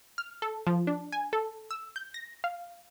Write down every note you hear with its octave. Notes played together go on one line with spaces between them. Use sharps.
F6
A4
F3
D4
G#5
A4
E6
G6
A#6
F5